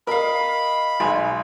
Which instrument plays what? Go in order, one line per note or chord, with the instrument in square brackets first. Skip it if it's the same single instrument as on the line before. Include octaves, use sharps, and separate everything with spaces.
[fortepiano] A#4 [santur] D#5 F5 [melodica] B5
[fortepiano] B1 G#5 [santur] G#3